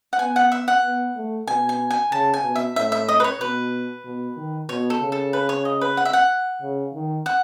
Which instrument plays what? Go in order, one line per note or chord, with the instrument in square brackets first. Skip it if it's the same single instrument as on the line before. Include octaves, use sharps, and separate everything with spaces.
[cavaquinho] F#5
[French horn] B3 [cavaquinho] G#5
[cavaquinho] F#5
E5
F#5
[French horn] B3
A3
[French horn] B2 [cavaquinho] G#5
[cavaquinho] G#5
G#5
[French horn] C#3 [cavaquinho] A5
[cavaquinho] G#5
[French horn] B2
[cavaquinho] E5
[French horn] A2 [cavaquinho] E5
[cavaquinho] E5
D#5
B4
C#5
[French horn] B2 [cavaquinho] B4
[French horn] B2
D#3
[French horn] B2 [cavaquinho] C#5
[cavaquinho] A4
[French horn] C#3
[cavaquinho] A4
B4
C#5
D#5
B4
F#5
E5
F#5
[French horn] C#3
D#3
[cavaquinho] F#5